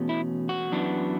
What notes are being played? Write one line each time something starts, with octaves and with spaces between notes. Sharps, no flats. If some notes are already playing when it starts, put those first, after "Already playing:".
Already playing: E2 B2 A3 C#4
E4
F#4
F#2 E3 B3 D4